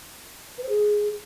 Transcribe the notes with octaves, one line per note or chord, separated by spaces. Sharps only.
B4
C5
G#4